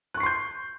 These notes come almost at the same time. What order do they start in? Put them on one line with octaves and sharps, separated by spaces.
F#6 C#6 C7 C6 G6